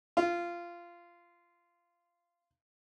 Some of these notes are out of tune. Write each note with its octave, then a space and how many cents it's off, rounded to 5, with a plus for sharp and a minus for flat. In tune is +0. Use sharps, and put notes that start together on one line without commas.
F4 -15